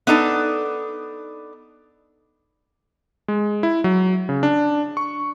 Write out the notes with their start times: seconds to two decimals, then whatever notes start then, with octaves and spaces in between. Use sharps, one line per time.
0.07 B3 D4 D#4 A4
3.28 G#3
3.63 E4
3.84 F#3
4.29 C#3
4.43 D4
4.97 C#6